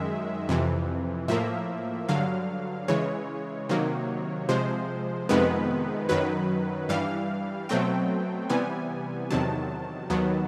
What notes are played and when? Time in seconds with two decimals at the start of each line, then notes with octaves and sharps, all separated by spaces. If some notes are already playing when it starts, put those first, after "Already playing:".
Already playing: F#2 D#3 G#3 E5
0.49 F2 C3 E3
1.28 A2 F3 A#3 E5
2.09 G2 D3 F#3 F5
2.88 C#3 E3 G#3 C#5
3.69 C3 D#3 F#3 A#3
4.49 C3 F3 G#3 C5
5.29 F2 C3 D#3 G#3 B3 B4
6.09 F#2 D#3 F#3 B4
6.89 G2 E3 G3 F5
7.69 B2 F#3 A3 C4 G5
8.50 C3 E3 G3 B3 G#5
9.31 E2 C3 D#3 F#3 A5
10.10 D#2 D#3 F#3 B3